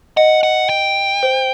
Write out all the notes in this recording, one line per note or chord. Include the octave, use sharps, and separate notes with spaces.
D#5 F#5
F#5
G5
C5